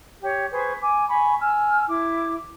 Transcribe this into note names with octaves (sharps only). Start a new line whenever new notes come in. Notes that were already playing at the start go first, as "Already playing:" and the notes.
G4 C#5
G#4 B4 C5 C#6
G#5 D6
G#5 B5 C#6
G#5 E6 F6
E4 D6